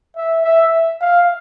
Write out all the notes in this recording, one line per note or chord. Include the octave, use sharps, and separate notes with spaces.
E5
E5
F5